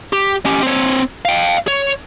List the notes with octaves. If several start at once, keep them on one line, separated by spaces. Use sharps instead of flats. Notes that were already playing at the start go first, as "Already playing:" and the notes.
G4
C#4 G4
C4 C#5
F5 G5
C#5